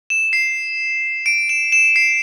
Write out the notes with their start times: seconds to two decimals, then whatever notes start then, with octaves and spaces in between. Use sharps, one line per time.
0.10 E7
0.33 C7
1.26 D7
1.49 E7
1.72 E7
1.96 C7